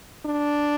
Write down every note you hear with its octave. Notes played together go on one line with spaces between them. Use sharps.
D4